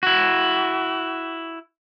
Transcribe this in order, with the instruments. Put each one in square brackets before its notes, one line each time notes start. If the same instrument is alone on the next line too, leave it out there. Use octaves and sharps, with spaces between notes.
[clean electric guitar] E4 F#4